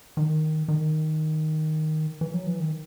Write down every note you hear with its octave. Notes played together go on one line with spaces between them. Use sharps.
D#3
D#3
E3
F#3
E3
D#3